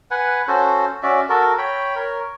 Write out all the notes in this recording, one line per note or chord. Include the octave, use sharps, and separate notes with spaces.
B4 F#5 G#5
C#4 F#4 A4 C5
C#4 F#4 D5 E5
F#4 A4 A#4
C#5 G5 B5
A#4 C#5